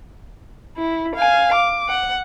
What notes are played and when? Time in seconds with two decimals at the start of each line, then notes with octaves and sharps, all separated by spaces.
0.78 E4
1.16 F5 G#5
1.54 D6
1.89 F#5